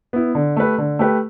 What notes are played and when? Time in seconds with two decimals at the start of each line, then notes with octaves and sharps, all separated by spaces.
0.13 B3 E4
0.35 D3
0.56 A3 G4 B4
0.78 D3
0.99 A3 G4 B4